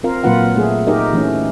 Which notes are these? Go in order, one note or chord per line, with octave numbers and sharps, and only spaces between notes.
C4 F4 A#4 F5
A#2 F#3 A#3 F4 B4 F#5
A3 G#4
D#4 G4 G#4 A#4 D#5
E3 A3 C#4